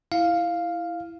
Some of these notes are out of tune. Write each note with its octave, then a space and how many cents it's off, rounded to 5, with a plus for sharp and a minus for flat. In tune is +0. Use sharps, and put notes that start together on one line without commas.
E4 +0 F5 +0